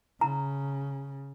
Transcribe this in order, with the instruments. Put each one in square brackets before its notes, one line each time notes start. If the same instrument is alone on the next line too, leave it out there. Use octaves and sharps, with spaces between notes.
[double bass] C#3 [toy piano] A#5